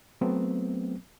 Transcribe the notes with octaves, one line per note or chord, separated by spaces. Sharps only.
F#3 A3 B3 C4